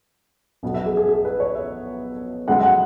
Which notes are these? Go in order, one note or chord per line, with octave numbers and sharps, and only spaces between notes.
B1 B2 B3
E5
G#4
G#4
G#4
B4
C#5
E5
F#2 C#3 G#3 F#5
E5
F#5